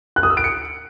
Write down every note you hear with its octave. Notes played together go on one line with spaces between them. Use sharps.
F#6
D#6
E6
D7
C#7